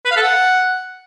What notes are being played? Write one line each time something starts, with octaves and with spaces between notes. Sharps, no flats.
B4
F5
A4
F#5